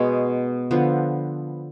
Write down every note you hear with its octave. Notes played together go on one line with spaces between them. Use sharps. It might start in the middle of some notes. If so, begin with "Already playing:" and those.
Already playing: B2 G#3 B3 C#5
D3 F3 B3